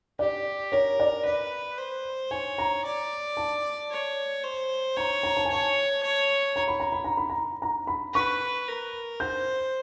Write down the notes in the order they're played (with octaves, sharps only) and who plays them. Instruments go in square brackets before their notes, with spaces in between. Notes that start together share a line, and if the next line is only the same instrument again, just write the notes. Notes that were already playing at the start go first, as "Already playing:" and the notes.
[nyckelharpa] G4 [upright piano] D5
[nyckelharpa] A#4 [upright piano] C#5
[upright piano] D5
[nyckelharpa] B4 [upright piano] D5
[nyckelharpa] C5
[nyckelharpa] C#5 [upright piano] G#5
[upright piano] A#5
[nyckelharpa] D5
[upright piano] A5
[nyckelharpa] C#5
C5
[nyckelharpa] C#5 [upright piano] A#5
[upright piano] A#5
A5
G#5
[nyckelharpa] C#5 [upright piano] A5
[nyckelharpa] C#5
[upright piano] A#5
B5
A#5
B5
A#5
B5
A#5
A#5
B5
[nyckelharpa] B4 [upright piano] C#6
[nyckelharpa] A#4
[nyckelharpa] C5 [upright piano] G6